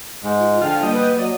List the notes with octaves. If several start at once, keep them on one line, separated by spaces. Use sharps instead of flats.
G#2 G#3
F4
D3 F3 F4 G5
G3 A#3 D#5
B3 B4
F#3 D5 D#5